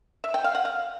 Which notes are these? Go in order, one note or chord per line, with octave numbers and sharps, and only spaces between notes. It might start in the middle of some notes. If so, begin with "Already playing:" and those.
E5
G5
F5
F#5
F5